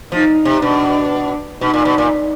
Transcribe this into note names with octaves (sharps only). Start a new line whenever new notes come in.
F3 D#4
C3
B2 D4
B2 D#4
A#2
B2
A#2